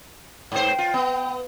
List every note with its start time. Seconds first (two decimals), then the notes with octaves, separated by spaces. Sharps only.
0.52 G#2 C5 G5
0.78 F4
0.94 B3